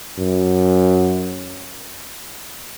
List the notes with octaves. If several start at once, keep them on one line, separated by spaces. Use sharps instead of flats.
F#2